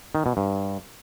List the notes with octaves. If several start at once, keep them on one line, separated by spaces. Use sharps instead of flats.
D#3
B2
G2